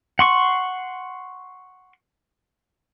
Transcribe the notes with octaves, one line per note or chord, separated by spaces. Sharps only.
F#5 C6 C#6